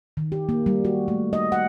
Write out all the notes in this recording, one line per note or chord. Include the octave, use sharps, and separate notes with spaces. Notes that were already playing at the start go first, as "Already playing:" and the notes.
D#3
G4
A#3
G3
F#4
A3
D#5
F#5